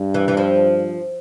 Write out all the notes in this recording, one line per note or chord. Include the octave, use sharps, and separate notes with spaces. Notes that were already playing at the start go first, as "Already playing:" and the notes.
Already playing: G2
E3
E3
F3